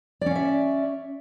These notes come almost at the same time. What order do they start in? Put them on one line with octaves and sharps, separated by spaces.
D5 C#4 F5 E5